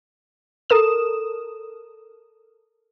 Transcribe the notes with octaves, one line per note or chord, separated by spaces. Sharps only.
A4 A#4 D#6 E7